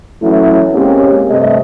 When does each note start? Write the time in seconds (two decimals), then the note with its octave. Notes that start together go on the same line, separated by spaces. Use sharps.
0.22 E3 F#3 A3 C#4 E4
0.74 G#3 A#3 C4 C#4 G4
1.30 G2 C3 A3 D#5